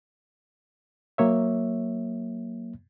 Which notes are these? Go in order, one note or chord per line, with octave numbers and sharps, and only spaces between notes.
F#3 A#3 C#5 E5